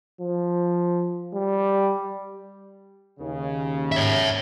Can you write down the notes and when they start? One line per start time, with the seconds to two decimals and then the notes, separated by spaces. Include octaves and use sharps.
0.21 F3
1.34 G3
3.20 D#2 C#3
3.92 C#5 E5